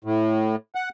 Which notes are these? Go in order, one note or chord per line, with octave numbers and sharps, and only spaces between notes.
A2
F#5